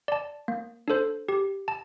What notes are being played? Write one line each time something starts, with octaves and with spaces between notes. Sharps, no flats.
D5 A5
A#3
D4 A4 C5
G4
A5